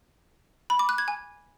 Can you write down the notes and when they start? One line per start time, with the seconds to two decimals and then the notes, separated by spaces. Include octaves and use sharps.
0.70 B5
0.79 D6
0.89 F#6
0.98 G#6
1.08 G#5